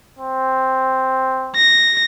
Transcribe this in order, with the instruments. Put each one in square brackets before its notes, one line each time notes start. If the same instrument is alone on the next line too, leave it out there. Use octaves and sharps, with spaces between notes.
[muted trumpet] C4
[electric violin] A#6